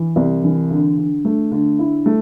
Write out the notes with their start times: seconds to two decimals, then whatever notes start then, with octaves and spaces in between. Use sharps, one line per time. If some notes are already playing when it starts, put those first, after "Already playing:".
Already playing: E3
0.16 C2
0.44 E3
0.71 D3
0.97 D3
1.25 A3
1.52 D3
1.79 E4
2.06 A3